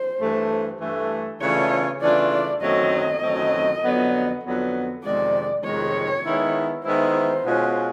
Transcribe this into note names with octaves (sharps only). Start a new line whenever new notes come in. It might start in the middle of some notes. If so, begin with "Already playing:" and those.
Already playing: C5
G2 E3 A3
G2 E3 A3
C#3 E3 A3 D4 F4 C#5
C#3 E3 A3 D4 F4 D5
D5
F#2 D#3 F#3 A3 C4 D#5
F#2 D#3 F#3 A3 C4
F2 D3 F#3 B3
F2 D3 F#3 B3
F2 C3 D#3 G#3 D5
F2 C3 D#3 G#3 C#5
D#3 G#3 B3 E4
D#3 G#3 B3 E4 C5
B2 G#3 C#4 F4